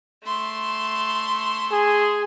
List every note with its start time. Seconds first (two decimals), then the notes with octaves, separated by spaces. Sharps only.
0.24 A3 C6
1.72 G#4